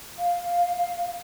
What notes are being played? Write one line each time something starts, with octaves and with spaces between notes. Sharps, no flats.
F5